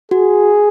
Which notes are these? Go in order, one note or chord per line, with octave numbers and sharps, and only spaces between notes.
F#4 G#4